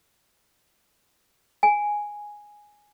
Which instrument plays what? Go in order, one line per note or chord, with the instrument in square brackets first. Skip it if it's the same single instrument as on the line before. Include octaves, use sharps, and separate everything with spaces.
[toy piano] G#5